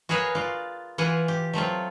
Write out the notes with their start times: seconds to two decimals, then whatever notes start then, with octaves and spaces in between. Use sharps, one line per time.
0.09 F#4 G#4 A#4 B4 C#5 F5
0.35 F4 D5
0.98 E3 F4 F#5 G#5
1.28 G4
1.53 F#3 A3 C4 F4